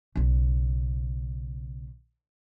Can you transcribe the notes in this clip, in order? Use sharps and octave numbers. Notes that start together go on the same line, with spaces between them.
B1 C#3